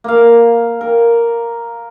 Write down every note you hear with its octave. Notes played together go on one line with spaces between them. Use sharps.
A#3 F5
A#4